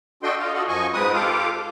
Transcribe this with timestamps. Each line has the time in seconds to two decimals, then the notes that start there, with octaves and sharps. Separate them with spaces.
0.23 D4 F#4 A4 D#5 G5 C6
0.39 F4 D#5 F5
0.53 F#4 A4 D#5 F#5
0.68 F#2 F3 D#5 G#5 C#6
0.93 G#2 C4 B4 D#6
1.14 F4 G4 A4 F5 D6